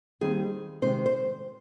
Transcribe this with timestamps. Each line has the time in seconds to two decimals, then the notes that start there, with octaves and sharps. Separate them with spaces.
0.21 D#2 D#3 G3 C4 G#4
0.82 C3 D#3 G#3 C4 C5
1.06 C5